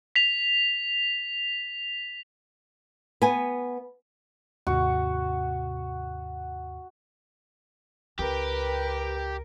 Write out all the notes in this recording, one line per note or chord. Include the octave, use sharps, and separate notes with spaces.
B6 F7
B3 G#5
D#2 G#2 C3 F#4
C#2 G4 A#4 B4